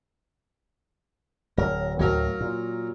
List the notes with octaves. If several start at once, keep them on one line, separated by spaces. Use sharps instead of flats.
D1 F#3 A#4
D2 A2 F#3 A#4 F5
A#2